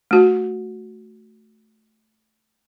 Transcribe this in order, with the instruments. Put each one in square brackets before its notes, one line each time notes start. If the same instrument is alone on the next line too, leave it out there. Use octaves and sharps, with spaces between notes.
[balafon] A3 F#4